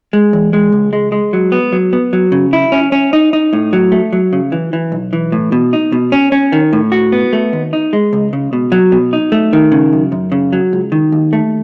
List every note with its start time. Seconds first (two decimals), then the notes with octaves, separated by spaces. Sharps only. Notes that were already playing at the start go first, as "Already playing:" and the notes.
0.13 G#3
0.33 E2
0.53 G#3
0.72 C#2
0.93 G#3
1.12 G#3
1.33 F#3
1.52 B3
1.72 F#3
1.93 B3
2.13 F#3
2.32 C#3
2.53 E4
2.72 C#4
2.92 C#4
3.13 D#4
3.33 D#4
3.53 A2
3.73 F#3
3.92 A3
4.13 F#3
4.33 C#3
4.52 E3
4.73 E3
4.92 B1
5.13 E3
5.32 A2
5.52 B2
5.73 D#4
5.92 B2
6.12 C#4
6.32 C#4
6.52 D#3
6.73 A2
6.92 F#4
7.12 B3
7.33 A3
7.53 D#2
7.73 D#4
7.93 G#3
8.13 C#2
8.33 C#3
8.53 B2
8.72 F#3
8.92 B2
9.13 D#4
9.32 A3
9.53 D#3
9.72 C#3
9.93 F#2
10.12 F#2
10.32 C#3
10.53 F#3
10.73 C#2
10.92 D#3
11.12 D#2
11.33 A3